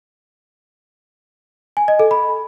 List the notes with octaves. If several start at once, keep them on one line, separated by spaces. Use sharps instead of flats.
G#5
D#5
A4
B5